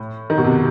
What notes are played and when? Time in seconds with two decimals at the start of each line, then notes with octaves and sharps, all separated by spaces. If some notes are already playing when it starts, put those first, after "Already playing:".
Already playing: A2
0.30 D#3
0.38 B2
0.44 C3